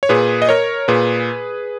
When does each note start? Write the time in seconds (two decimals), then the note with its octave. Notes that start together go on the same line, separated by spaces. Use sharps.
0.03 C#5
0.09 A#2 G#4 B4
0.42 D#5
0.49 A#4 C#5
0.88 A#2 G#4 B4